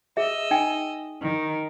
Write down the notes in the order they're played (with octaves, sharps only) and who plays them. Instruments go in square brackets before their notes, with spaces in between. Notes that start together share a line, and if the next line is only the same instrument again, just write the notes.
[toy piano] G#4 E5 [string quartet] D#5 E6
[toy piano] D#4 G5 G#5
[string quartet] D#3